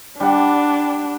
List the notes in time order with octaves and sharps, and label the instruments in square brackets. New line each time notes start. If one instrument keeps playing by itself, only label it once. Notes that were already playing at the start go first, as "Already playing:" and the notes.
[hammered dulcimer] G3 F#5 [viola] D4